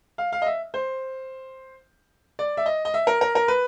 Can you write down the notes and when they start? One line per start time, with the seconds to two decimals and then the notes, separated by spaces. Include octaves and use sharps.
0.18 F5
0.32 F5
0.42 D#5
0.46 E5
0.74 C5
2.39 D5
2.57 E5
2.66 D#5
2.85 D#5
2.94 E5
3.07 A#4
3.21 A#4
3.35 A#4
3.48 B4